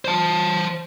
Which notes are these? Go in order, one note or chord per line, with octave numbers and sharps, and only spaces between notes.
C5 A5